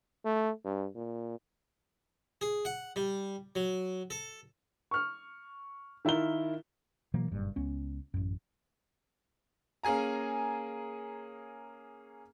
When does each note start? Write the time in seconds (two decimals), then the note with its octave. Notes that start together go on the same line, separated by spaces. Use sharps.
0.25 A3
0.65 G2
0.96 A#2
2.41 G#4
2.65 F#5
2.96 G3
3.55 F#3
4.10 A4
4.91 C#6 F6
6.05 D#3 E4 F4 A#4 G7
7.14 B2 E3 F#3 A#3
7.31 F#1 G2 A#2
7.56 C#2 B3 C#4
8.14 A1 F#2
9.83 A#3 C#4 G#4 G#5 A#5